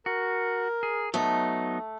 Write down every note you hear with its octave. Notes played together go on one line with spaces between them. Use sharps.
F#4 A#4
G#4
F#3 A3 B3 D#4